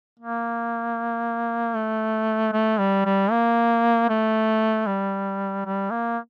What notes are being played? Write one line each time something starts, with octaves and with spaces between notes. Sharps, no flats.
A#3
A3
A3
G3
G3
A#3
A3
G3
G3
A#3